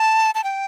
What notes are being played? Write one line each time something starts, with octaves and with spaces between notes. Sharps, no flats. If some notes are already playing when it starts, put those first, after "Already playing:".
Already playing: A5
A5
G5